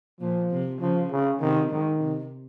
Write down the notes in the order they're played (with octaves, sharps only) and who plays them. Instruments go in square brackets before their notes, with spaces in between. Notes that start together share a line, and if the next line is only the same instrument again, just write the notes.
[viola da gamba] A#2 [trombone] F3
[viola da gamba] C3
[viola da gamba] C#3 [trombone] F3
[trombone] C#3
[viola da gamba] C3 [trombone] D#3
[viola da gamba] G#2 [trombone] D#3
[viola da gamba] C3